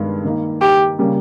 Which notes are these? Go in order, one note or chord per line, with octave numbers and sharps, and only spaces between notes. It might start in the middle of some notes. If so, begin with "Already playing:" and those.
Already playing: G2 D#3 G#3 B3
D#3 A#3 D#4
G4
C#3 G3 A#3